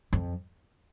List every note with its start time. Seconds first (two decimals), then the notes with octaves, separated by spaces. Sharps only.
0.13 F2